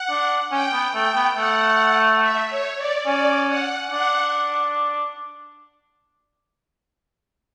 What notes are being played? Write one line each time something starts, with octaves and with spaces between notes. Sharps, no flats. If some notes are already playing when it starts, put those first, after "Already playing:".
Already playing: F#5
D4
C#4 G5
B3
A3 G5
B3
A3 F#5
E5
C#5
D5
C#4 D5
F#5
D4 F#5